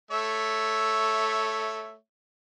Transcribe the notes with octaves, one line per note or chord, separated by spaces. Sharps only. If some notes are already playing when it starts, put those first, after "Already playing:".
A3 C#5 E5